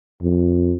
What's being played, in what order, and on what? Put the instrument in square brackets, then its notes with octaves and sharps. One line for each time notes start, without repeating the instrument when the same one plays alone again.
[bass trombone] F2